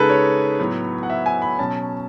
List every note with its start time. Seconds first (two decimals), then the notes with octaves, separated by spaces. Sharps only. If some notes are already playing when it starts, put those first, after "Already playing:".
Already playing: C#3 G#3 D#4 G#4 A4 B4
0.10 C#5
0.59 A2 F#3 B3
1.03 F#5
1.10 E5
1.26 G#5
1.42 B5
1.59 B2 F#3 C#4 A5